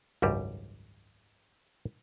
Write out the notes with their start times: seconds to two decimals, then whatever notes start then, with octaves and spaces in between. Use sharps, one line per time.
0.22 G#1 C#2 F#2 G3